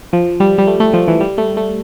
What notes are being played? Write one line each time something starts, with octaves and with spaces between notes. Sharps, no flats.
F3
G3
G3
A3
A3
F3
E3
G3
A3
A3